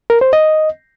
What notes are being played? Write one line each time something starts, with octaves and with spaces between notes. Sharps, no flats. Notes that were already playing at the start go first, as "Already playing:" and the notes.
A#4
C5
D#5